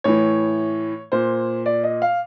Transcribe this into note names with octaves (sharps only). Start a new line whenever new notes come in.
A2 E3 C#5
A#2 C5
D5
D#5
F5